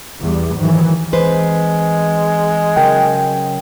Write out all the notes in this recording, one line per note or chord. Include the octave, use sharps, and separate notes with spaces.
E2 G3
G#2 D#3 E3 F#3
E3 G#3 C4 B4 C5
C#3 F#3 A#4 G5